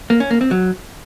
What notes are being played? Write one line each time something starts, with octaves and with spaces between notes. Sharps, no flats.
A#3
C#4
A#3
C4
F#3